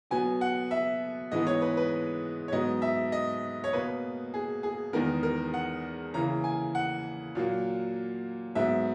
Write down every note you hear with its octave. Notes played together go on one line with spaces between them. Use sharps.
B2 F#3 B3 G#5
F#5
E5
G#2 E3 G#3 B3 D#5
C#5
B4
B4
C#5
G#2 F#3 B3 D#5
E5
D#5
C#5
B2 A#3 B4
G#4
G#4
E2 D#3 G#3 B3 A#4
A#4
F#5
C#3 E3 A#3 A#5
G#5
F#5
A#2 F#3 A#3
G#2 F#3 B3 E5